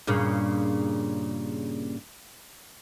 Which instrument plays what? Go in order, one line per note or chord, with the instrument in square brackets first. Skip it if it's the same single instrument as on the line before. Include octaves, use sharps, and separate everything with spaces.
[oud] G2 A#2 C#3